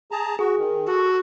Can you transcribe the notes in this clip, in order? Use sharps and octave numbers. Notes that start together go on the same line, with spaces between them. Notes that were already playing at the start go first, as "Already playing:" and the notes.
G#4 A5 A#5
F#4 G#4
D#3
F#4 A4